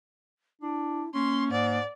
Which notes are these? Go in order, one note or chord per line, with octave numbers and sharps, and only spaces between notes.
D4 E4
A#3 C#4 C6
G#2 D5